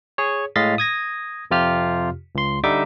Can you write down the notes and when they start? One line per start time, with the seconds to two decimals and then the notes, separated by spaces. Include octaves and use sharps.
0.18 G#4 C#5
0.56 A2 G#3 D#5 F5 A6 B6
0.78 D#6 G#6 A#6
1.51 F2 C3 F4 G4 F6
2.35 C#2 C6
2.63 D3 G3 D#4 E5 D6